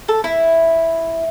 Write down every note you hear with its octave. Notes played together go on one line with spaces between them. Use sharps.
A4
E4